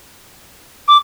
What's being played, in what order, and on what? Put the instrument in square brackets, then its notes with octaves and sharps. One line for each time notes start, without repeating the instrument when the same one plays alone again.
[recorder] D6